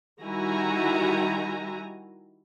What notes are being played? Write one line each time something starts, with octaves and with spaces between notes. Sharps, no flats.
D#3 G3 E4 F#4 G#5 A#5